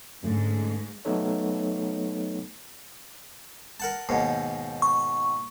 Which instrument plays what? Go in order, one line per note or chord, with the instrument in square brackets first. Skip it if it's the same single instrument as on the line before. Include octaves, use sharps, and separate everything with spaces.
[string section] G#2 [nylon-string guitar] D3 A3 C#4
[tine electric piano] F#3 A3 B3 D#4 A4 C#5
[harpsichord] A#4 F#5 A5
D#2 G#2 B2
[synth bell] C#6